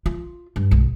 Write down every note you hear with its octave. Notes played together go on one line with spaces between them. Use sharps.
F4
G2
B1